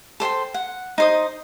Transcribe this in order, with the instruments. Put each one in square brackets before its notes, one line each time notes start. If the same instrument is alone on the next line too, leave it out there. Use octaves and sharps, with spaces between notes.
[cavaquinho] A4 C5 G5 C6
F#5
D#4 C5 D#6